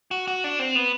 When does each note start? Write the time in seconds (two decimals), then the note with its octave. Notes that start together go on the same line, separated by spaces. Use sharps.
0.11 F#4
0.28 F#4
0.44 D4
0.59 C4
0.75 B3